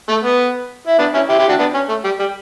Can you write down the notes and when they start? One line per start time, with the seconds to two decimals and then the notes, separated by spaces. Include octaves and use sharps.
0.09 A3
0.24 B3
0.87 E4
0.99 B3 D4
1.14 C#4 E4
1.29 E4 G4
1.39 E4 G4
1.49 D4 F#4
1.59 B3 D4
1.74 C#4
1.89 A3
2.04 G3
2.19 G3